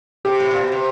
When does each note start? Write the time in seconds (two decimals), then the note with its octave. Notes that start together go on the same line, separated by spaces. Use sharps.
0.25 C3 G4
0.40 A2
0.51 A#2
0.61 B2
0.72 C3